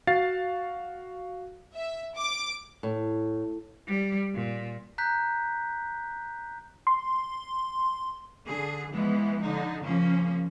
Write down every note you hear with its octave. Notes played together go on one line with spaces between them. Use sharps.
F#4 F5 A6 C7
E5
D6
A2
G3
A#2
A#5 F#6 G6 B6
C6
D3 G#4
E3 F3 G#3 B3
D3 D#4
C#3 F3 A#3 C#4